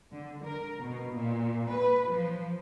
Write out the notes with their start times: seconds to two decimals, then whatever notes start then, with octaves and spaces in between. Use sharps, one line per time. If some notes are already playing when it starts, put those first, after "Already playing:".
0.11 D3
0.45 A#4
0.80 B2
1.15 A#2
1.73 B4
2.11 F3